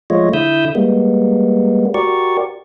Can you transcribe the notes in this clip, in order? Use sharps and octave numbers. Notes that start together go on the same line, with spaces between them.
F3 G#3 A3 F4 C#5 D#5
D3 E4 E5 D#6 E6 G6
G3 G#3 A#3 B3
F#4 G4 A#4 D5 C#6